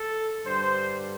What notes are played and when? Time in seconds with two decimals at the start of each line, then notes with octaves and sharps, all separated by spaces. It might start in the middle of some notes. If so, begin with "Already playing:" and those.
Already playing: A4
0.45 G2 D3 G3 C5